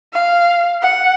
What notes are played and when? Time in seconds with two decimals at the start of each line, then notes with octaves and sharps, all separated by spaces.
0.13 F5
0.82 F#5